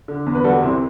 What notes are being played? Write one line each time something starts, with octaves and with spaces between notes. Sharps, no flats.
D3
E2
B4
G3 F#4 A4
C2 C4 E4